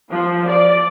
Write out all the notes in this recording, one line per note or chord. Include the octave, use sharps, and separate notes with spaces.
F3
D5